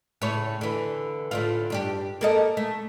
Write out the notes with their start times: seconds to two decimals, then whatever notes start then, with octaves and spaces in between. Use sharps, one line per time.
0.22 A2 C#3 C#5
0.61 D3 E3
1.31 A2 D3 F4
1.70 G2 D4 G4
2.21 A#3 A4 D#5
2.57 A3